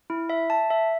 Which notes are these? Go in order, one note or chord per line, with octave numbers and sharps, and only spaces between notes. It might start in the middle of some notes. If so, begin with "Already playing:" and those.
E4
E5
A5
E5